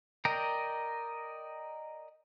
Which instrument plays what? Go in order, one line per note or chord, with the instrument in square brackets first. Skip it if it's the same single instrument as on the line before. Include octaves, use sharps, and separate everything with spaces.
[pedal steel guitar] A#4 D5 D#5 G5 A#5